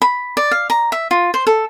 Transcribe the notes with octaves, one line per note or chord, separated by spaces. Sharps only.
B5
D5
F5
A#5
E5
F4
C5
A4